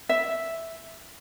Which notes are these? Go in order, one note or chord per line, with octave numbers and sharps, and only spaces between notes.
E5